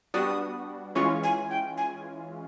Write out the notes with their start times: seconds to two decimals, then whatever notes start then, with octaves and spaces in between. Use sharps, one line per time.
0.14 G3 B3 D4 F#4 D#6
0.95 E3 G#3 C#4 F4 C#6
1.23 G#5
1.51 G5
1.77 G#5